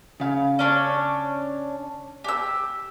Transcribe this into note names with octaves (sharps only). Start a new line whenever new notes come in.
C#3 F5
C#4 D4 C#5
G4 E6